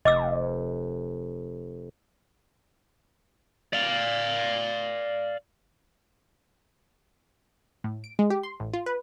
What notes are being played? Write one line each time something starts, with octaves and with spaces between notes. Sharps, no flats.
F1 D#5 D6 E6
D5 F5
A2
D7
G#3
G4
C6
A1
F4
B4